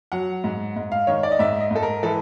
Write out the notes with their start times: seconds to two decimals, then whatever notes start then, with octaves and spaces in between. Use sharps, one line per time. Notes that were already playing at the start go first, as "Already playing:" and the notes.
0.12 F#3 F#5
0.44 G#2
0.76 G#2
0.92 F5
1.07 D#3 C#5
1.23 D5
1.32 D#5
1.39 G#2 E5
1.60 D#5
1.71 G#2 A4
1.83 A#4
2.03 E3 A4